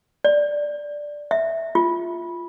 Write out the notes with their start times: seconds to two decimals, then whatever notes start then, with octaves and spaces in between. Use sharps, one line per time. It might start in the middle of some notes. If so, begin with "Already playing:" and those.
0.25 D5
1.31 E5
1.75 F4